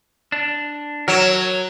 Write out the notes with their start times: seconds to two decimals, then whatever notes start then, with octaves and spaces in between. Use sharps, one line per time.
0.32 D4
1.08 F#3 A#4 C#5 E5